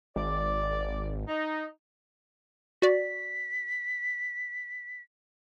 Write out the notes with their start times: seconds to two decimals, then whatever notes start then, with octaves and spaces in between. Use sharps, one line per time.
0.16 G#1 D5
1.26 D#4
2.82 F#4 D5 B6